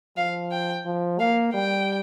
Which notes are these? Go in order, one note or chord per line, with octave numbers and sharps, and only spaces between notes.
F3 F5
G5
F3
A#3 F5
G3 G5